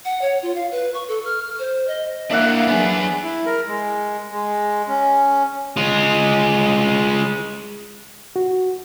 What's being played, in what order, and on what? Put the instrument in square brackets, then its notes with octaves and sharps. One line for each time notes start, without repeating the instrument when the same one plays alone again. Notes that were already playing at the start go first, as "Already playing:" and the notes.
[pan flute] F#5
C#5
F4
F5
B4
C#6
A4
F6
C5
D#5
[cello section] A#3 [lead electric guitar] D4 E4 [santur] E5 F#5
[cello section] F#3 D4 [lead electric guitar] B3 G#4
[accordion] E4
A#4
G#3
G#3
C#4
[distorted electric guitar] G#3 F4
[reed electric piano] F#4